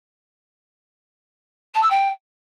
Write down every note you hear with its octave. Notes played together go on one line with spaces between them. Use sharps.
A5
E6
G5